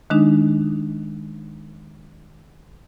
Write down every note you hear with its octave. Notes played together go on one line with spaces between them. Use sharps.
D#3 G#3 D4 D#4